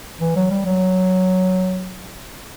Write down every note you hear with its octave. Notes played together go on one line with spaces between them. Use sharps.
E3
F#3
G3
F#3